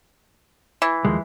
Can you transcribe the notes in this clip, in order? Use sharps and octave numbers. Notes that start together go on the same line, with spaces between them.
E3
D#2 F3 G#3